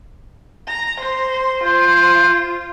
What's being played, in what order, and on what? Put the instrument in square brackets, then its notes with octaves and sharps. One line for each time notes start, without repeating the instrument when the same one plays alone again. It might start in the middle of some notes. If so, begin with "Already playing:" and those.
[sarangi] A#5
C5
[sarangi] F4 [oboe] C5